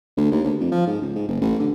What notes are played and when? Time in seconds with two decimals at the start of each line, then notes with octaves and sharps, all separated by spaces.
0.17 D2
0.32 D#2
0.44 D2
0.60 F2
0.72 F3
0.87 G#2
1.02 C#2
1.15 G#2
1.28 F#1
1.41 A1
1.59 D3